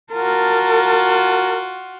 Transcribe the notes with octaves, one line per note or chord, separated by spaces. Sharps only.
F4 F#4 A#4 A5